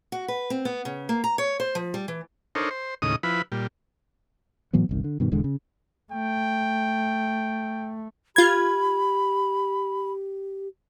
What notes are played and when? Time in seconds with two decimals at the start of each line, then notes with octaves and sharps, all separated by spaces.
0.12 F#4
0.28 B4
0.50 C4
0.65 B3
0.85 C#3
1.09 A#3
1.24 A#5
1.38 C#5
1.60 C5
1.75 F3
1.94 G3
2.08 E3
2.55 D4 D#4 A4 A#4 C5 C#5
2.71 C5
3.02 D#2 A2 C#3 D#5 D#6
3.23 F3 E4 B4 B5
3.52 A#2 G3
4.73 A2 E3 F#3 B3
4.89 G1 C2 D#3
5.04 D3
5.20 G2 B2 D#3
5.32 E1 E2 D3 G#3
5.44 C#3
6.12 A3 G5
8.36 F4 G4 B5 G#6